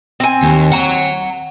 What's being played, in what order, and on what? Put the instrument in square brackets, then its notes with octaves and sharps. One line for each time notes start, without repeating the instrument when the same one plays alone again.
[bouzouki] C4 G#5
[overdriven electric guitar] D#2
F#5 A#5